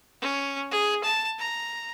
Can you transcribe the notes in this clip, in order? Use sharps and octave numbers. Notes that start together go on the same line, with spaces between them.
C#4
G#4
A5
A#5